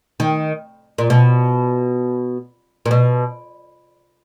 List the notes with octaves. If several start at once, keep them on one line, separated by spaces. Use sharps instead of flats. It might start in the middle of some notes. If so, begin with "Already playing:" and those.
D#3
A#2
B2
A#2
B2